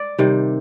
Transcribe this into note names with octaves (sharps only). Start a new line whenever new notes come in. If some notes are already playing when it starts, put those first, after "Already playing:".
Already playing: D5
C3 D#3 G3